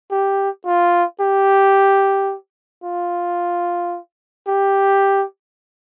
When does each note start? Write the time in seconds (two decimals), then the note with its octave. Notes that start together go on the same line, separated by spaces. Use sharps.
0.11 G4
0.66 F4
1.20 G4
2.84 F4
4.47 G4